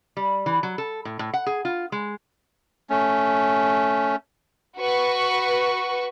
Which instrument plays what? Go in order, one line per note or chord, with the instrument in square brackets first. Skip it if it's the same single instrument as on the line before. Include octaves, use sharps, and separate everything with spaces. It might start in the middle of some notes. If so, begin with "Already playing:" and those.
[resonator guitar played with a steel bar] G3
E3
F#3
A4
A2
A2
F#5
G#4
F4
G#3
[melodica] A3 C#4
[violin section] F#4 B4 C#6